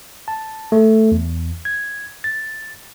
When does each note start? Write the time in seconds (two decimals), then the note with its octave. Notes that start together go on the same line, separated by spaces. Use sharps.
0.28 A5
0.72 A3
1.12 E2
1.65 G#6
2.24 A6